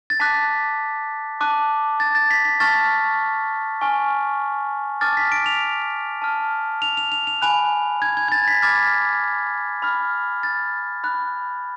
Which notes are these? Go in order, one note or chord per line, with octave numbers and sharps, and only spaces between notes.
A6
A5 D6 F#6 B6
A5 D6 F#6
A6
A6
B6
B6
A5 C#6 F6 A6
G#5 C#6 F6
A5 D6 F6 A6
B6
D7
F7
A5 F6
F7
F7
F7
F7
G#5 B5 F#6 F7
G#6
G#6
G#6
A6
B6
B5 D6 F6 A6
B5 F6
A6
B5 F#6